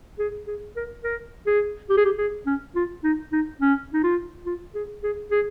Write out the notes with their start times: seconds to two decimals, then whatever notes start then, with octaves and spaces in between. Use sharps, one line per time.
0.19 G#4
0.47 G#4
0.76 A#4
1.04 A#4
1.47 G#4
1.89 G4
1.97 G#4
2.05 G4
2.18 G#4
2.46 C#4
2.75 F4
3.04 D#4
3.32 D#4
3.61 C#4
3.93 D#4
4.03 F4
4.46 F4
4.75 G#4
5.03 G#4
5.31 G#4